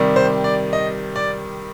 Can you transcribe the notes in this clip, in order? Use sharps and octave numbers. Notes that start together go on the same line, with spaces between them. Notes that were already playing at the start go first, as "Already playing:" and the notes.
Already playing: C3 D#3 G3
C5
D5
D#5
D5